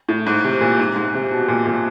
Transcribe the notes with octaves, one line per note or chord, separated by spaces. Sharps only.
A2
G#2
C3
A#2
G#2
G#2
C3
B2
A#2
A#2